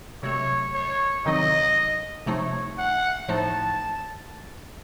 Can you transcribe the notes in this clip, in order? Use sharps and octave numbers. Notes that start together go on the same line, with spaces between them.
C3 F#3 A3 C#5
C#5
C3 D#3 F#3 C4 D#4 D#5
C3 F3 A3 D#4 C#5
F#5
A2 F3 A3 D#4 A5